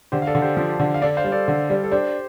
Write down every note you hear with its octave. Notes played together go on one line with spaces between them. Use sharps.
D3 G4 C5
F5
A4 D5
D3
G4 C5
F3
D3
F5
D4 A4 D5
C5 F5
G3
A4 D5
D3
G3
A4
D4 G4 C5